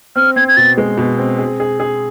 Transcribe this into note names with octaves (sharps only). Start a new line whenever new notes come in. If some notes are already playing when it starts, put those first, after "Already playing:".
C4 F6
C4 G#6
G#6
B2 A6
G#3
B2
C4
G#4
G#4
G#4